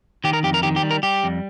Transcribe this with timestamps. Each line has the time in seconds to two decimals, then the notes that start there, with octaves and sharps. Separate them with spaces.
0.24 D#3 G4
0.33 A#4
0.43 F2 G4
0.54 A#4
0.63 D#3 G4
0.76 G4
0.83 G3
0.91 A#4
1.03 G3 G4
1.24 F2